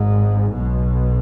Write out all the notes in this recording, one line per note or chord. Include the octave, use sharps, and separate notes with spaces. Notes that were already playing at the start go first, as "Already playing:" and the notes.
Already playing: G#1 G#2
B1 B2